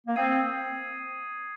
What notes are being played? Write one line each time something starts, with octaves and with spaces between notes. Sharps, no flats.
A#3
C4 D#6 G#6 C7 D#7